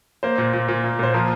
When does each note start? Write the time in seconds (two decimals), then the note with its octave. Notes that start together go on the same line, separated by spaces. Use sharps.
0.23 A#3 C5
0.38 A#2
0.53 A#2
0.68 A#2
0.84 A#3
0.99 A#2 C5
1.14 F3 A#4